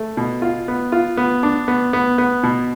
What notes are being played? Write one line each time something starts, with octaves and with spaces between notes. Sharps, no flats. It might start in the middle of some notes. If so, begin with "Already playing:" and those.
Already playing: A3
B2
F4
B3
F4
B3
D4
B3
B3
B3
B2